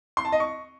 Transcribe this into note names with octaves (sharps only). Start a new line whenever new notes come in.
C6
A5
D#5
C#6